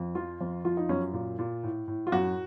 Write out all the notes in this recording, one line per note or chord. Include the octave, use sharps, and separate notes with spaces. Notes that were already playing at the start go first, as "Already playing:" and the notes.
Already playing: F2
F3 F4
F2
F3 F4
D#4
F#2 C#4
A#2
A#2
A2
A2
F4
F#2 F#4